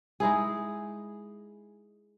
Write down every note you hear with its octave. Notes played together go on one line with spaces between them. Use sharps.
G#3 D#4 E4 G#4